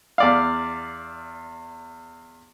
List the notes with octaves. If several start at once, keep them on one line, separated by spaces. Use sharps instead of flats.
E2 D5 F5